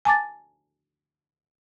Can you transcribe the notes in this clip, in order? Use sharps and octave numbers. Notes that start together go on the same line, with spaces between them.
G#5 A5 D6 A6